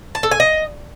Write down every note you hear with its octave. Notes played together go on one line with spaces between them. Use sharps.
A5
A4
G#5
D#5